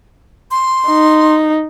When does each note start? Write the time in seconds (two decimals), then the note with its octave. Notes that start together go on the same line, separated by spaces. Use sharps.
0.51 C6
0.88 D#4